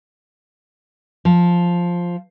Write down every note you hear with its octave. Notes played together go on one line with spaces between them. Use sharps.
F3